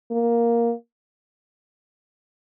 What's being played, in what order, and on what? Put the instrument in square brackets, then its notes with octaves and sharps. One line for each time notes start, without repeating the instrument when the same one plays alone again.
[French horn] A#3